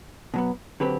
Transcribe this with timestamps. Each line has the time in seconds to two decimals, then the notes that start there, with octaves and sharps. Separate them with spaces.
0.34 B2 F#3 B3
0.80 D3 F#3 C4 G4 B4